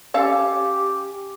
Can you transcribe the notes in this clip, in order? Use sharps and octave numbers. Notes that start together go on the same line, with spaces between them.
C#4 G4 A4 F5